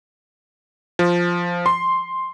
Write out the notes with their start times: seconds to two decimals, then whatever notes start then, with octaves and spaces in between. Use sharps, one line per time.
0.99 F3
1.66 C6